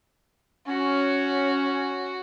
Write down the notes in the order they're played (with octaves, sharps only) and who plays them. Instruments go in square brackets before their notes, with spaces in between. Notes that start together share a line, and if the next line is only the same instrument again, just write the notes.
[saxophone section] C#4 [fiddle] F#4